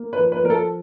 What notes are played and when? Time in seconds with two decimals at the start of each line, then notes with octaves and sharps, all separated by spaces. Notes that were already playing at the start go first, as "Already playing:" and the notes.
Already playing: A#3
0.13 B4
0.19 F3
0.32 B4
0.44 F3 A#4
0.50 A4